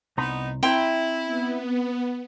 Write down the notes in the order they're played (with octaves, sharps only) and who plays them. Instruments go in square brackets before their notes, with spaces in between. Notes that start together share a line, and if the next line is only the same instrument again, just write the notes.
[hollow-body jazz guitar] C2 A#5 C6 [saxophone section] B3 D#4
[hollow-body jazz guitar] C4 [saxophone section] E4 [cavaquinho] G5 A#5 C6
[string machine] B3